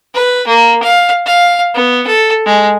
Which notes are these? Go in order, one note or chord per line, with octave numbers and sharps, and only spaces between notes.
B4
A#3
F5
F5
B3
A4
G#3